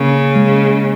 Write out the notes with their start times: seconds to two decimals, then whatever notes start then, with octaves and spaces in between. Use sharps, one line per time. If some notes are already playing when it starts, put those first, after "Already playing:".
Already playing: C#3 A#3
0.36 G#3